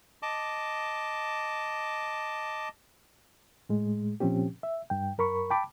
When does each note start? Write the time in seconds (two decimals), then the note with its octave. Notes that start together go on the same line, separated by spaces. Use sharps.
0.23 D#5 A5 D6
3.69 A2 G#3
4.20 A#2 F3 C4 C#4 G4
4.63 E5
4.90 G2 G5
5.18 F#2 A#4 B5 C#6
5.50 G5 A5 B5 D6